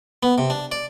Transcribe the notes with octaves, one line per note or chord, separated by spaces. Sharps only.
B3
C3
D4
D5